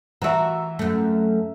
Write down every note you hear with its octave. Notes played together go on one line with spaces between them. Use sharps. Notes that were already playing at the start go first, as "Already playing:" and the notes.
E3 F#4 E5 A#5
F#2 A3